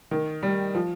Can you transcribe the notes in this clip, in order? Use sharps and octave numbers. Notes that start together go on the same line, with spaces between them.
D#3
G3
F3